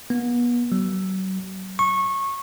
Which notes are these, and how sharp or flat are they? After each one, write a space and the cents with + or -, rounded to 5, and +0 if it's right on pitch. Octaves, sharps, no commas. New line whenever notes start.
B3 -35
F#3 +35
C#6 -20